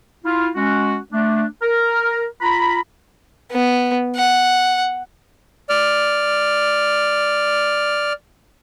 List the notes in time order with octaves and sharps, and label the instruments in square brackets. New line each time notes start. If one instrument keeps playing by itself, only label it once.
[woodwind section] E4 F4
G#3 C#4 F#4
A3 D4
A#4
F4 A#5 B5
[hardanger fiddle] B3
F#5
[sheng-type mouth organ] D5 F6